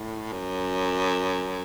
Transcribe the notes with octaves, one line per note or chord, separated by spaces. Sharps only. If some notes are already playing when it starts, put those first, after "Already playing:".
Already playing: A2
F#2